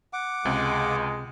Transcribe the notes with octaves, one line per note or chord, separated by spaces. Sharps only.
F#5 D6
C#2 C3 G#3